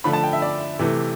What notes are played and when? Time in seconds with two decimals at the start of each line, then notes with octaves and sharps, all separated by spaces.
0.04 D3 F3 A3 B5
0.13 A5
0.24 G5
0.33 E5
0.42 D5
0.79 C3 E3 A3